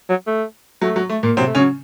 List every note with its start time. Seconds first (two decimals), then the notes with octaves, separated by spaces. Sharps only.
0.10 F#3
0.27 A3
0.82 F#3 A3
0.96 F#3
1.10 A3
1.23 A#2 A#3
1.37 C3 F#3 C4
1.47 A3
1.55 C#3 F#3 C#4